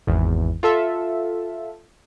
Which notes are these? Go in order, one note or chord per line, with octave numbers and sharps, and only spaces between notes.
G#1 E2
F4 A4 E5